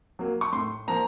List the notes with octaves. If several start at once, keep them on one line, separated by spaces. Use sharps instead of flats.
F#3 A#3
C#6
A2 C6
F3 A#3 A#5